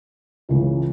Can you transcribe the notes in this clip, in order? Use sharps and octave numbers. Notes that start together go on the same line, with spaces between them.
C#2 C#3 E3 G#3